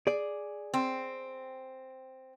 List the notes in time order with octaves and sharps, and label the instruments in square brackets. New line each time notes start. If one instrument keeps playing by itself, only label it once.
[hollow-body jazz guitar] G#4 D5
[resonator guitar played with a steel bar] C4